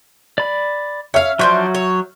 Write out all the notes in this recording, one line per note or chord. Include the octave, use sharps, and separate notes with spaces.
D5 B5
C#5 E5 F5 F6
F3 F#3 D4 C5 C#6 G6
C#5